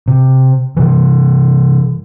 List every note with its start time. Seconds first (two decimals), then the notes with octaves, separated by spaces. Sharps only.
0.08 C3
0.77 C3 E3